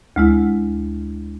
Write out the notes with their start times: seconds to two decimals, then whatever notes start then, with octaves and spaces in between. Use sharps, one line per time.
0.16 D2 G#3 E4